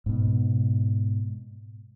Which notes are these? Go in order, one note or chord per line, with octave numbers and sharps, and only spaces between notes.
G#2 B2